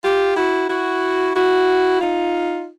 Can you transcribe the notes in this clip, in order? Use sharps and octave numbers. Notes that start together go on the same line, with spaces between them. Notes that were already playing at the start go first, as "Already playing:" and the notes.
F4 G4
E4 F#4
E4 F#4
E4 F#4
D#4 F4